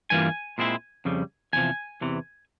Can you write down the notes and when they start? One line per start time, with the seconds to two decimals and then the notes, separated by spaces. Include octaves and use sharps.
0.10 G2 E3 G3 A#3 F4 G#5
0.58 A#2 G#3 C4 E4
1.05 F2 C#3 G3
1.53 E2 C3 F3 G#5
2.01 E2 C3 E3